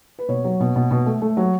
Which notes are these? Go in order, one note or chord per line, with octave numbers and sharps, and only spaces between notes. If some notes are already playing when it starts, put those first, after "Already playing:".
B4
B2 C#5
F#3
B2
B2
B2
A3
A3
F#3